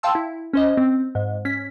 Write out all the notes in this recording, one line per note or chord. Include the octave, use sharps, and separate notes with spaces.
F5 G5 A5 C6 E6
E4
C#4 C5 D#5
C4
G#2
C#4 B6